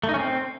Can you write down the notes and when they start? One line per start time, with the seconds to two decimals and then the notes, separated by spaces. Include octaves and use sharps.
0.04 A3
0.09 D#4
0.14 C#4
0.19 C4